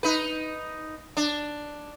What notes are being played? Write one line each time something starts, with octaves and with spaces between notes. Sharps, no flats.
D#4 B4
D4